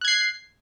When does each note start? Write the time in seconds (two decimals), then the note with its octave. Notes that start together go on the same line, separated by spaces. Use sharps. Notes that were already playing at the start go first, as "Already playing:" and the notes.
0.01 F#6
0.05 G#6
0.08 C7